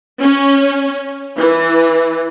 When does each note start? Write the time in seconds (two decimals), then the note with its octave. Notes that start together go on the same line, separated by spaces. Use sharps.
0.20 C#4
1.36 E3